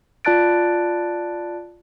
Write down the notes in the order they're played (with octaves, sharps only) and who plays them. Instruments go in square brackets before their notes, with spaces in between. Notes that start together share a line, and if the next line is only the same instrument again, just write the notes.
[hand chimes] F4 D5 A5 F#6 A6 D7